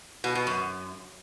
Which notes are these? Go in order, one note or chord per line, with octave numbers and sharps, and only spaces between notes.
B2
B2
F#2